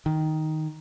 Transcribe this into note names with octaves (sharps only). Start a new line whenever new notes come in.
D#3